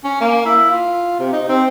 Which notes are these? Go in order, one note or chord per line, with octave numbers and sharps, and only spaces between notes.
C#4
A#3
E4
F4
C3
D#4
C4